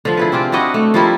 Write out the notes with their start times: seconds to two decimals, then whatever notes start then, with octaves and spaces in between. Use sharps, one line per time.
0.05 D3 F3
0.17 E4 G#4 B4
0.32 C4 D4 F4 G4
0.52 D4 E4 F#4 D#5
0.74 A3
0.94 F3 G3 E4 A#4